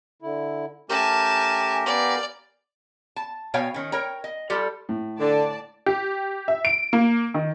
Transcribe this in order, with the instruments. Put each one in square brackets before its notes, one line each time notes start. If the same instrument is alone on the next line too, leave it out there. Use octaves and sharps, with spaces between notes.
[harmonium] D3 E4
[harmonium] A3 C#4 [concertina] G4 A#4 [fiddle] G#5 A5
[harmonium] B3 F5 G#5 [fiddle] D5
[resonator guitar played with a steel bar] A5
B2 C#5 F5 G5 G#5
D#3 C#4
A#4 C#5 G5 A#5
D#5
G3 F4 G4 A4
[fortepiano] A2
[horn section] D3 [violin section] D5 A5
[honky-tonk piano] G4
E5
D7
A#3
D#3